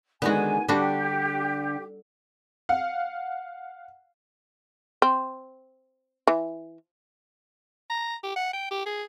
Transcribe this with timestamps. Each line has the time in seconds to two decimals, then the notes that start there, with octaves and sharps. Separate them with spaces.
0.22 D3 D#3 G#3 B3 F#4 G#5
0.68 D3 G3 D4 F#4 G4
2.69 F5 F#5
5.02 C4
6.27 E3
7.90 A#5
8.23 G4
8.36 F#5
8.53 G5
8.71 G4
8.86 G#4